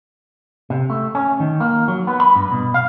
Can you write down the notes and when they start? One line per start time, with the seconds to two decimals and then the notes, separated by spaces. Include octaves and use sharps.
0.70 C3
0.90 A3
1.15 C#4
1.40 D#3
1.60 A#3
1.88 F#3
2.07 B3
2.20 B5
2.35 G2
2.52 B2
2.74 F5